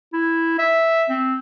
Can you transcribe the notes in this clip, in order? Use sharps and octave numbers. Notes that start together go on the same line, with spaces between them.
E4
E5
C4